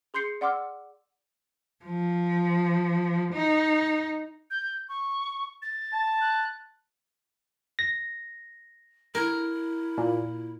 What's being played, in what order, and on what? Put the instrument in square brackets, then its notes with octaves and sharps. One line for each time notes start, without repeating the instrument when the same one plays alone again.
[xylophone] G#4 C6 G6 C7 C#7
D5 F#5 C6 D6 E6 F6
[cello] F3
D#4
[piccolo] G6
C#6
A6
[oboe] A5
[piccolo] F#6
[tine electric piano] A#6
[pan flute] E4 [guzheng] A#4
[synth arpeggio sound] A#2